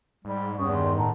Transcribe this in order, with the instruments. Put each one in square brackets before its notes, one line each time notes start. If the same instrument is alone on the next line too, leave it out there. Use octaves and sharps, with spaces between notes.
[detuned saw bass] G#2 [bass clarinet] G3
[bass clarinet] E2 [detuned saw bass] G2 [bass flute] C#4 [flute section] C#5 C#6 D#6
[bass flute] D#3 [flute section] D#5 C6
[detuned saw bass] A2 [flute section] F#5 A5 A#5